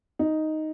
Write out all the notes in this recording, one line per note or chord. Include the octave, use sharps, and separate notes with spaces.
D#4